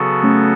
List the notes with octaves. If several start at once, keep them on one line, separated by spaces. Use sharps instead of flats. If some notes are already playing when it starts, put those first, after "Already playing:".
Already playing: C#3 F#3 B3 F#4 A4
A3 C#4